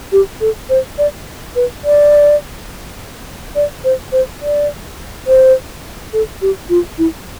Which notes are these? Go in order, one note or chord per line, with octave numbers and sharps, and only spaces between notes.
G4
A4
C5
D5
B4
D5
D5
C5
C5
D5
C5
A4
G4
F4
E4